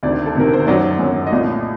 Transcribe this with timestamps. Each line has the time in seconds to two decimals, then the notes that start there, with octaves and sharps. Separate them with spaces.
0.03 D2 C3 D#3 D5
0.26 A4
0.35 D2 C3 D#3 A#4
0.53 C5
0.67 F#2 D#3 F#3 D5
0.99 F#2 D#3 F#3
1.26 D#5
1.31 C2 A#2 A3 D5